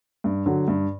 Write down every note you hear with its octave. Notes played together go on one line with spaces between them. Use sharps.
G2
D3 F#3
G2